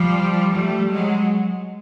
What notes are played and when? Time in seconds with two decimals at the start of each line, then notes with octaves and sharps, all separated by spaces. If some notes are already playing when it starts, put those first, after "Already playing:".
Already playing: F3 G3
0.52 G3 A3
0.90 F#3 G#3